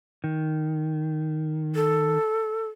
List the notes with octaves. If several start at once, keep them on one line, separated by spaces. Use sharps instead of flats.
D#3
A4